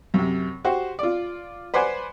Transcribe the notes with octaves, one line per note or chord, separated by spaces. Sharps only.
F#2 C3
F#4 G4 C5
F4 D5
B4 C5 D5 F#5 G#5